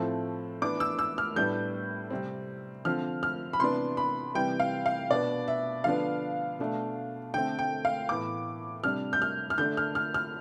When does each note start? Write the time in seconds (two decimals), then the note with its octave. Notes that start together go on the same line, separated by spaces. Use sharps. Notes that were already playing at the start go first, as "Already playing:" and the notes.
Already playing: A2 F3 A3 C4
0.62 E3 B3 D4 D6
0.80 E6
0.99 E6
1.18 F6
1.36 A2 G3 B3 D4 G6
2.10 C3 G3 C4
2.85 D3 F3 C4 F6
3.23 F6
3.53 B5
3.60 C3 E3 B3 D4 C6
3.97 B5
4.35 C3 E3 G3 G5
4.60 F5
4.86 F5
5.10 B2 B3 D4 D5
5.48 E5
5.84 D3 F3 B3 D4 F5
6.59 B2 A3 D4
7.34 D3 A3 C4 G5
7.59 G5
7.85 F5
8.09 A2 E3 B3 D6
8.84 C3 G3 D4 F6
9.13 G6
9.22 F6
9.50 F6
9.58 D3 A3 D4 G6
9.77 F6
9.95 F6
10.14 F6